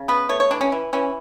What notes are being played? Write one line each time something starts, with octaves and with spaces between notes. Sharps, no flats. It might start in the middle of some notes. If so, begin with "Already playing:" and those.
Already playing: C#3
B3 B4
A3 C#5
C#5
E3 D4
C#4
E3
E3 C#4